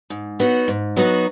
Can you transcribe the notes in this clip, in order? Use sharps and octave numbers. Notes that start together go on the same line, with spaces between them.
G#2
F#3 B3 D#4 F#4
G#2
F#3 B3 D#4 F#4